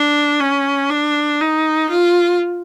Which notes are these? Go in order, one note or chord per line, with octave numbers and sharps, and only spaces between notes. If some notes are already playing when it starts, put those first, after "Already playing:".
Already playing: D4
C#4
D4
D#4
F4